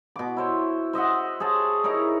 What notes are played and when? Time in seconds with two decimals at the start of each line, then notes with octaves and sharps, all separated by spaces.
0.16 B2 D6
0.37 E4 C5 C#5
0.93 C5 D#5 E5 F#5
1.40 G#4 C5 C#5 A5
1.84 D#4 E4 A#4 C#5